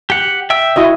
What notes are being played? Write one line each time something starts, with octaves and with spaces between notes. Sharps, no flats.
G4 F#5
E5 G5 E6
E4 F#4 D#5